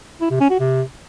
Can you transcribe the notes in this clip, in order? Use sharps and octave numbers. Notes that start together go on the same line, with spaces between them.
E4
C3
C#4
F#4
C3